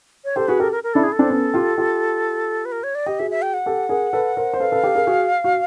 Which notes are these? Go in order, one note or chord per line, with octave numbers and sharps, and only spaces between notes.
C#5
G4 A4 C5
F#4 G#4 B4
G4 A4 A#4
A#4
A#4
D4 E4 A4
G#4
A4
C4 D4
B3 C#4
F4 G4
F4 G4
B4
A#4
C#5
D5
G4 D#5
F#4 G#4 E5
E5
G5
F#5
G4 A4
G#4 A#4
A4 B4
A#4 C5
C5
A4 B4 F5
A4 B4
G4 A4
G#4 A#4
F#4 G#4
F#4